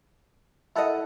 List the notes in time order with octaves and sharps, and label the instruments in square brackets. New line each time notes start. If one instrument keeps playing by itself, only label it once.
[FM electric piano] E4 A4 F#5 [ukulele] A#4 D#5